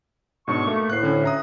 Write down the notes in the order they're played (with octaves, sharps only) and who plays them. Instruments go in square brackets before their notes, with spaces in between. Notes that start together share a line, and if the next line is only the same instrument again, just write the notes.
[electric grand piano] G#2 B2 D4 [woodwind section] C#6
[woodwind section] A3 [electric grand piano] A#3
[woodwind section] D2 A2 [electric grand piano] F#6 C7
[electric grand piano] D3 C#4
E5 A#5 D#6